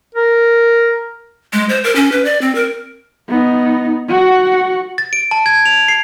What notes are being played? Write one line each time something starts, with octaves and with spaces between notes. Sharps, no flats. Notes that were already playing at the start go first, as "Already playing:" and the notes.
A#4
G#3
C5
A#4
C#4
B4
D5
C4
A#4
B3 D#4
F#4 F#5
A6
D7
A5
G#6
F7
C7